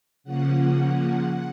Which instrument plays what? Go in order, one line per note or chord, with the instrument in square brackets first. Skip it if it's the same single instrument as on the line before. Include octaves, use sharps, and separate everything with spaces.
[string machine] C#3 F3 A#3 C#4 F#5